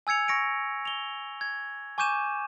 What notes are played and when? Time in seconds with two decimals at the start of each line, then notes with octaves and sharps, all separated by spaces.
0.07 G#5 E6 G#6 C#7 F7
0.28 C#6 A#6 C#7 D7
0.85 F7 G7
1.41 G#6
1.98 G#5 C#6 D6 G6 D#7 E7